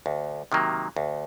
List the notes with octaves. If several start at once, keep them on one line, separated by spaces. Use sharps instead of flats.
D2
C3 D#3 F#3 A#3
D2